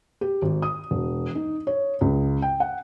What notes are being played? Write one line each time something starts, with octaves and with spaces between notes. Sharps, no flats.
G4
G#1
D#6
E1
D#4
C#5
C#2
G5
F#5